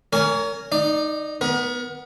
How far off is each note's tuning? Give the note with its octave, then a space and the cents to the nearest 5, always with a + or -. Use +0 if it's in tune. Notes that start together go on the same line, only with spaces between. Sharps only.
A#4 -10 C#5 +35 G#5 +0
D#4 -5 D5 +20
B3 +0 A#4 +40